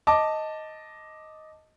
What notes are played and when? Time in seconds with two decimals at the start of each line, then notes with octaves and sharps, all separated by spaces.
0.07 D#5 A5 D6